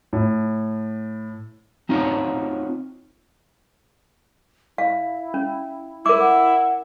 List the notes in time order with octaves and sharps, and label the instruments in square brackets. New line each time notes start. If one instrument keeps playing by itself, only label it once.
[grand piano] A2
[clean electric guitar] C4 D#4 F4 F#4 C5 C#5
[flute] E4 [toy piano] F5
[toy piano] C#4
[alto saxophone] E4 [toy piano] A#4 D6
[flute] F#5